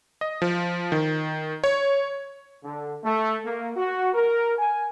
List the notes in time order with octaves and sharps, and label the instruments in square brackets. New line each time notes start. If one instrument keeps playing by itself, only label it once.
[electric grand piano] D#5
F3
D#3
C#5
[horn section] D3
A3
A#3
F#4
A#4
G#5